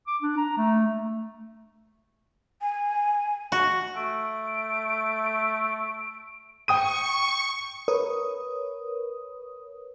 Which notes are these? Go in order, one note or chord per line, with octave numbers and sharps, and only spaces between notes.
D6
D4
A#5
A3
A3
G#5
F#4
A3 D7
G5 C#6 D#6 D#7
A#4 B4 C#5 D#6